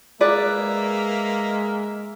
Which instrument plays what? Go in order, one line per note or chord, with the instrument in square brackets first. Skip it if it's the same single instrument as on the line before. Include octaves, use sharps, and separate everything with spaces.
[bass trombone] G#3 [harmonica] A#3 A#4 E5 [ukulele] G#4 B4 D5